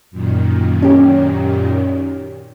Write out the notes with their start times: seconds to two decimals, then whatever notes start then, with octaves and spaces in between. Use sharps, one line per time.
0.11 F#2 A#2 D#3
0.82 C#4 G4